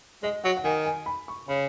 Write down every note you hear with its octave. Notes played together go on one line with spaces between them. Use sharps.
G#3 D#5
F#3 F#5
F#5
D#3 G#5
G#5
B5
C#6
C#3 B5